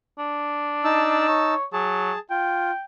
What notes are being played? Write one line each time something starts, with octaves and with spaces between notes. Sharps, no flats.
D4
D#4 A5 E6
C#5
F#3 G#4 A5
F4 G5